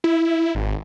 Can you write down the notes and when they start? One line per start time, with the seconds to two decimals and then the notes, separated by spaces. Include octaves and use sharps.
0.04 E4
0.55 G#1